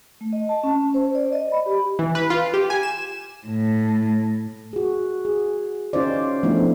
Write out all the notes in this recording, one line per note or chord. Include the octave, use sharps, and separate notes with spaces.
A3
D#5
A5
C#4
C#4
C5
D5
D#5
B5
G4
E3
B4
F4
G4
G#5
E7
A2
F#4 G#4
G#4
C#4 D#4 F4 C5 D5
F3 A3 B3 D4 E4